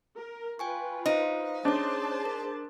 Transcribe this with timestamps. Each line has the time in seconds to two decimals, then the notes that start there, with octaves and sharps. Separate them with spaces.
0.16 A#4
0.59 F4 B4 G5 G#5 C#6
1.06 D#4 C5 F5
1.65 C#4 D4 G#4 C5 C#5 A5
2.25 A#4